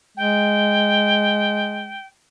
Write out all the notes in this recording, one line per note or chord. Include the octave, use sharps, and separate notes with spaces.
G#3 G5